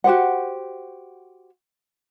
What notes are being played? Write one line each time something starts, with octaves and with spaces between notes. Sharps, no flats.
F#4 G4 C5 F#5